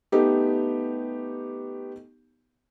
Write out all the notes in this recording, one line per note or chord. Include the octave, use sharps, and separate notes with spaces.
A3 B3 D#4 G4